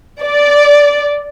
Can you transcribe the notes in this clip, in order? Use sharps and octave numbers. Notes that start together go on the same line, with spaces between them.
D5